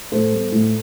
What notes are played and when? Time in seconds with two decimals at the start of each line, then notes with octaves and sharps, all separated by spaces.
0.12 A2 A4 C5
0.32 G3 B3
0.52 A2